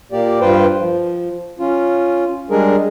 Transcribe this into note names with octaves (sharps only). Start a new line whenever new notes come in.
A#2 A#3 G4 D5
G2 F4 B4 C5 G5
F3
C#4 F4
G3 G#3 D4 G#4 A#4